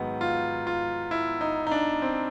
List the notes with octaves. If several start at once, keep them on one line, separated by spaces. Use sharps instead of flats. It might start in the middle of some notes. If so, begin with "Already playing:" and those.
Already playing: G#2 D#3 F#3 B3
F4
F4
E4
D#4
D#4
D4
C4